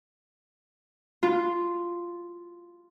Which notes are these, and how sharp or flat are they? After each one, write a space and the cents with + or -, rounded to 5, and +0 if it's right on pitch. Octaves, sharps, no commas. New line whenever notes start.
F4 -5